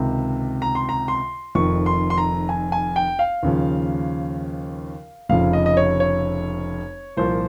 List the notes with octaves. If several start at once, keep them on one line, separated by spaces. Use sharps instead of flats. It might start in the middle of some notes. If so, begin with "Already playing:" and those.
Already playing: C#2 C3 D#3
A#5
C6
A#5
C6
F1 F2 D#3 C#6
C6
C6
A#5
G#5
G#5
G5
F5
D#2 C#3 F3
F1 F2 C#3 F3 F5
D#5
D#5
C#5
C#5
C2 A#2 F3 C5